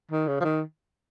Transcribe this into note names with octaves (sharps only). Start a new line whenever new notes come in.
D#3
C#3
F3
D#3